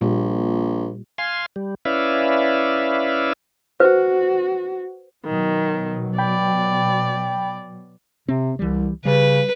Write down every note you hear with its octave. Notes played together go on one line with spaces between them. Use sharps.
A#1 A#2 G3
F5 G#5 C6
G3
C#4 E4 B4 D5 E5 F5
F#4 B4 C5
B2 D#3 F#3
D5 G5 B5
C3 C4
C2 E3 G3
C#3 G3 B4